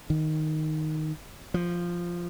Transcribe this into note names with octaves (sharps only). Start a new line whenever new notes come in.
D#3
F3